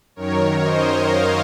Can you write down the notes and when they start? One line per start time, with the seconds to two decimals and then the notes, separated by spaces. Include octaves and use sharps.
0.16 F#2 D#3 A#4 C#5
0.62 C5 D#5
1.08 C#5 F5